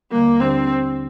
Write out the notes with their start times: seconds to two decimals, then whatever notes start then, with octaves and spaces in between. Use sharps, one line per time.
0.12 D#2 D3 G3 A#3
0.40 D3 G3 C4 D4 G4 C5